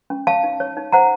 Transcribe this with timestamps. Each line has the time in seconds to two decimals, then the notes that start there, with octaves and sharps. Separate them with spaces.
0.10 C#4
0.27 C#5 F5 A5
0.44 D#4
0.60 C#5
0.77 D#4
0.92 C5 F#5 A#5